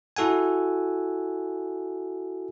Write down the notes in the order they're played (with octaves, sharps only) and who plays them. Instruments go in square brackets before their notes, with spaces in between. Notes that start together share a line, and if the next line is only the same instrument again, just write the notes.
[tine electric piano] E4 F#4 A4 F#5 G#5